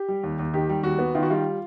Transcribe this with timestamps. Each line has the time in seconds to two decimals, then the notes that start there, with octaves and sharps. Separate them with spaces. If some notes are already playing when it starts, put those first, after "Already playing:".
Already playing: G4
0.08 G3
0.23 D#2
0.39 D#2
0.54 D#3 G4
0.69 G3
0.83 D#2 F#4
0.99 B3
1.15 D#3 F4
1.22 F#4
1.30 G3 F4